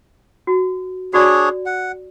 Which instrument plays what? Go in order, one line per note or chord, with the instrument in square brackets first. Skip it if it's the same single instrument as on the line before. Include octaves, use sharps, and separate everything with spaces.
[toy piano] F#4
[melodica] D4 G#4 C#5 [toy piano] F#4 D5
[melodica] F#5